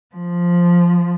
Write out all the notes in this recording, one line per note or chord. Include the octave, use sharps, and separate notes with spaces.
F3